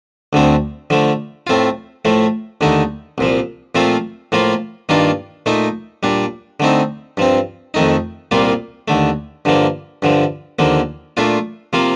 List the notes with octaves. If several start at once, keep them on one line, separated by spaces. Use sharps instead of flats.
D2 D3 A3 C4
D3 F3 A3
A2 A3 C4 F4
A2 F3 A3
D#2 D3 A3 D#4
C2 A#2 F3
A#2 F3 A3 C4 F4
A2 F3 A#3 F4
G2 D#3 A#3 D4 F4
A#2 A3 D#4
A#2 G3 D4
D3 A3 C4 D#4
G2 F3 C4
F2 D#3 A3 D#4
C2 A#2 G3 A#3 F4
D#2 D3 A3
G2 D3 F3 A#3
G2 D3 F3
D#2 D3 F3 A#3
A#2 A3 D4 F4
C3 F3 A#3 F4